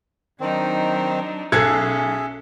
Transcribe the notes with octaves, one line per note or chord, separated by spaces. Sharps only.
D#3 F#3 C4 D4 D#4
B1 C#4 G#4 A4 E5 F#6 G#6 C7